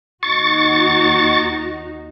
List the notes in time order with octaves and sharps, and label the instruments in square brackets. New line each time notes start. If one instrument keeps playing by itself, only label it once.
[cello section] D#2 D#4 F#4 [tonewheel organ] C#6 A6